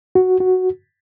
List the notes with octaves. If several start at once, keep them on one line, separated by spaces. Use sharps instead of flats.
F#4
F#4